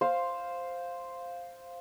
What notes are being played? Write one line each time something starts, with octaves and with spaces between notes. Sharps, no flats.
C5 F5